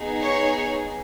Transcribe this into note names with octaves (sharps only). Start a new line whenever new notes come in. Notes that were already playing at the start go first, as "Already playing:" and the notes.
Already playing: B3 D#4 G#4
C#5